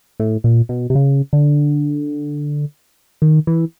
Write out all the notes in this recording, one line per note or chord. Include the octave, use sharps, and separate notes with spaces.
A2
A#2
B2
C3
C#3
D3
D#3
E3